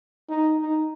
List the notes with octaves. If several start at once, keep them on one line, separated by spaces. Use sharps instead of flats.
D#4
D#4